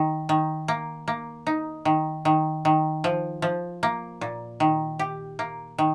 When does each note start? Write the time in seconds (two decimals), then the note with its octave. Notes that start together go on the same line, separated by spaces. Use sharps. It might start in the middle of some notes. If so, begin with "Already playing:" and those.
Already playing: D#3
0.29 D#3
0.68 A#3
1.08 A#3
1.47 D#4
1.85 D#3
2.25 D#3
2.65 D#3
3.04 F3
3.42 F3
3.83 A#3
4.21 A#2
4.60 D#3
4.99 G4
5.39 A#3
5.78 D#3